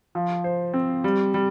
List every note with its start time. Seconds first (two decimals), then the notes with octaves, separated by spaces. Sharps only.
0.15 F3
0.44 C5
0.74 C4
1.04 G3
1.34 G3